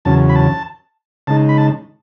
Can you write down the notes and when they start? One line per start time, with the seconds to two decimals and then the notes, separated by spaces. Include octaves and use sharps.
0.05 E2 C#3 F#3 C#4 A5
0.29 B5
0.35 A5
1.27 C#3 G#3 D#4 A5
1.49 B5
1.58 A5